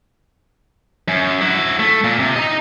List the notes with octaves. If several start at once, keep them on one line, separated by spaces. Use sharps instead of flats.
F#2
E4 F#4
A3
A#2
C3
D#5 A#5